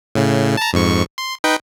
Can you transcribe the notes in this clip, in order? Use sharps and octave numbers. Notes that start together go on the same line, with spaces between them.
A2 C#3
A5 A#5
F2 G#2 C#6
C6
D#4 B4 G5